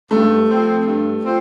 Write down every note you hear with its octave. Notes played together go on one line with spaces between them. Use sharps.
G2 A3
F3 C4
G2
F3 C4